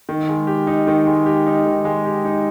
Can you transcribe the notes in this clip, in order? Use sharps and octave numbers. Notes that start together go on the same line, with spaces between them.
D#3
G#3
G4
D#4
D#3
G#3
G4
D#4
D#3
G#3
G4
D#4